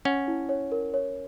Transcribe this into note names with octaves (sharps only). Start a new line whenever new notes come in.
C#4 F#5
E4
C#5
A#4
C#5